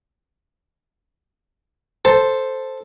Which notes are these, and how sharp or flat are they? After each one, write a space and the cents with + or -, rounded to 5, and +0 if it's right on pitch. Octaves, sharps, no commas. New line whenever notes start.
A4 +0 C5 +0 A5 +0